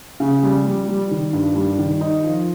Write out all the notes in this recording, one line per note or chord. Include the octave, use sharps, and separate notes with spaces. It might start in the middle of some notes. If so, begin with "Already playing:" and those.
C#3
G3
G3
G3
D#3
G2
G3
D#3
D#4
F3